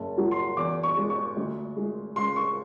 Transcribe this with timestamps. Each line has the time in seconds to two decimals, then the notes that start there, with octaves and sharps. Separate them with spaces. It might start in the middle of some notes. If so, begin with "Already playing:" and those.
Already playing: F#1 A5
0.18 F#3
0.31 C6
0.57 E2 D6
0.83 C#6
0.97 G#3
1.10 C#6
1.37 D2
1.76 G#3
2.16 C#2 C6
2.36 C#6